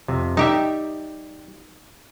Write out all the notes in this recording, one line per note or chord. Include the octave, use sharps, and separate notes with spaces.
F2 C3
G3 D#4 G4 E5